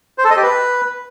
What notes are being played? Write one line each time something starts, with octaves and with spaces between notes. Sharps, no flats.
C5
A4
D#5
G4
B4